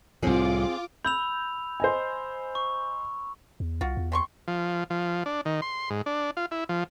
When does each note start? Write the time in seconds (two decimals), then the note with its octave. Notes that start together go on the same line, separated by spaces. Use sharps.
0.22 C2 A2 C4 F4 G#4 D6
1.04 B5 E6 G6 F7
1.80 C5 D#5 G#5
2.55 C#6
3.60 E2
3.81 C2 F4 F#4
3.97 E2
4.12 C3 C6 C#6
4.48 F3
4.90 F3
5.26 D4
5.45 D#3
5.62 C6
5.90 G#2
6.06 D4
6.37 F4
6.51 E4
6.69 F3